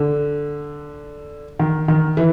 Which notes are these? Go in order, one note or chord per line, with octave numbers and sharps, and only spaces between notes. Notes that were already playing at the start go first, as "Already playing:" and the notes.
Already playing: D3
D#3
D#3
E3